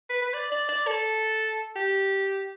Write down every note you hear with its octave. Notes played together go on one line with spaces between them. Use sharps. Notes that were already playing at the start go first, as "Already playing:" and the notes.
B4
B4
D5
D5
D5
A4
G4